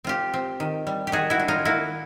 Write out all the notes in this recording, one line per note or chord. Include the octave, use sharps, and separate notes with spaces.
C4 F4 G4
C4
D#3
G3
G4
D#3 F#4 G#4
E4 F#4
D4
D#4 F4
A#3 E4 F#4